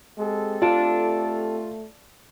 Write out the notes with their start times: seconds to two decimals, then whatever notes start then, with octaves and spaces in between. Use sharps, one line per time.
0.18 G#3 C4 G4 A4
0.62 A3 F4 D5 A5